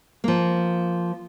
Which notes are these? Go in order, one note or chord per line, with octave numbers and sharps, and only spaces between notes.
F3 A#3